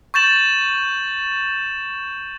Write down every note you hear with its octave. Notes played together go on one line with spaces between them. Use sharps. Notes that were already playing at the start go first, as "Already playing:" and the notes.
C#6 G6 A6 E7 F#7